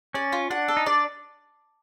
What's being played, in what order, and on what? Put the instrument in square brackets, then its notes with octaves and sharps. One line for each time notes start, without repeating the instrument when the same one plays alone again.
[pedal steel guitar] C#4 [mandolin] D5
[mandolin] F4
[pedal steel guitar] D4 [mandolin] F#5
[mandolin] A4
[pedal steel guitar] D#4
[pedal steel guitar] D4 [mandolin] D5